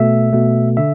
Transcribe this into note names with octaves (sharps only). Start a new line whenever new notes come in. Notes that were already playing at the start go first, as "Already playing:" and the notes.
Already playing: B2 A3 E5
B2 A3
D3 E5